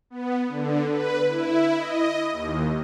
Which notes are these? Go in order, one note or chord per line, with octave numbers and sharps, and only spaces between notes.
B3
D3
B4
E4
D#5
D#2